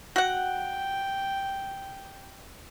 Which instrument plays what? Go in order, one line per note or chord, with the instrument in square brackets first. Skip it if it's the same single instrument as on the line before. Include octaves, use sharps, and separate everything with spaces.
[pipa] F#4 F#5 [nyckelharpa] G5